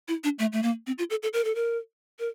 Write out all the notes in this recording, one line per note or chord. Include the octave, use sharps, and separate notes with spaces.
E4
D4
A3
A3
A#3
C4
F4
A4
A4
A#4
A4
A#4
A#4